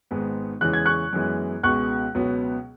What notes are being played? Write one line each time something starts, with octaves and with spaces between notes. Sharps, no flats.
G#1 G#2 G#3 B3
E2 C#3 E3 G#3 F#6
G#6
C#6 F#6
F#2 E3 G#3 B3
C#2 B2 G#3 B3 C#6 F#6
C#2 B2 F#3 B3